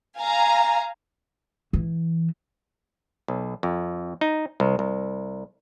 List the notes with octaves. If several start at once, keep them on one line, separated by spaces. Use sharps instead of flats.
F5 G#5 A#5
E3
B1
F2
D#4
C2
C2